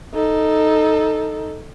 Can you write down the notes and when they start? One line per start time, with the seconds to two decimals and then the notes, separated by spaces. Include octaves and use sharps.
0.14 D#4 A4